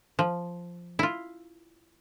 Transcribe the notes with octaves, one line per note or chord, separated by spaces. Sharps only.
F3
E4 F4